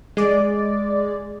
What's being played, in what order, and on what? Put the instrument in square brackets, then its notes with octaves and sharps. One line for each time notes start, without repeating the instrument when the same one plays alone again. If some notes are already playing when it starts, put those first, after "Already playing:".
[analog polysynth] G#3 D5